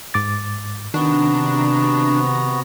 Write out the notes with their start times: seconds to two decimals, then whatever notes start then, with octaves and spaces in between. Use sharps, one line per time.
0.14 G#2 D6 A6
0.94 C3 D#3 B3 D4 F#4 A#5